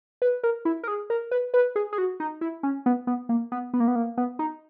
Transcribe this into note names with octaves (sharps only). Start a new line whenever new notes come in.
B4
A#4
E4
A#4
G#4
A#4
B4
B4
G#4
G#4
F#4
D#4
E4
C#4
B3
B3
A#3
B3
B3
A#3
B3
A#3
B3
D#4